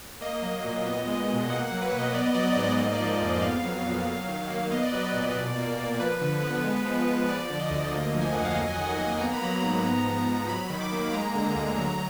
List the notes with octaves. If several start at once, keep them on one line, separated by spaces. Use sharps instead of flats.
A#3 D#5
F#3
A#2
B3
G#3
B2
A#3 F#5
F#5
F#3
B4
B2
D#5
B3 D5
D#5
F#3 D5
D#5
G#2 D5
D#5
D5
A#3 D#5
D5
F3
F2
B3 F5
F#3
A#2
F#3
D#3
A#3
B3 D#5
D5
F#3 B4
D5
A#2
B2
A#3
A#3
F3 B4
D3
B3
G#3
F3
B3
F3 D5
D3
D#5
D2
A#3
F3
G#5
F2 F#5
F5
F#3 D#5
G#5
D#3 F#5
G#5
A#3
G#5
B3 A#5
B5
F#3 A#5
G#2
B3
F3
G#2
F#3 B5
D#3
D6
A#3
G#3 A#5
D3
D2
F#3